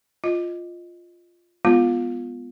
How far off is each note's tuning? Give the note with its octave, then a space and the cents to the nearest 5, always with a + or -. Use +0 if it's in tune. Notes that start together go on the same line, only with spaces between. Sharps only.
F4 +0 D#5 +0
G#3 +0 B3 +0 F4 +0